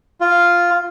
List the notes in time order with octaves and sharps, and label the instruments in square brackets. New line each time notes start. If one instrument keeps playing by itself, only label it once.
[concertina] F4